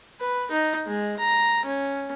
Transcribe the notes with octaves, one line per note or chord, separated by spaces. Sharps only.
B4
D#4
G#3
A#5
C#4